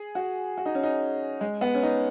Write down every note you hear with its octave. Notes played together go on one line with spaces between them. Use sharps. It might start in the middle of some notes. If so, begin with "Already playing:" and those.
Already playing: G#4
F#4
F#4
D#4
C#4
D#4
G#3
B3
C#4
D#4